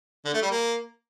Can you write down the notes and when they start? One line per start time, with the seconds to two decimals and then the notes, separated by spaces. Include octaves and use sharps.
0.25 D3
0.34 A3
0.42 G3
0.51 A#3